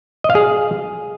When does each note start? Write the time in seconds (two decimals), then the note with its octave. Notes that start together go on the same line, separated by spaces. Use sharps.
0.24 D#5
0.30 F5
0.35 G#4